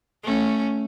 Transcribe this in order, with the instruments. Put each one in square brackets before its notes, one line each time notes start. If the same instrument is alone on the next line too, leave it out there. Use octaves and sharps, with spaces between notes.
[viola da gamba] A3 C#4